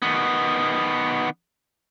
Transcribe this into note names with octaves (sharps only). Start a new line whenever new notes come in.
D#3 B3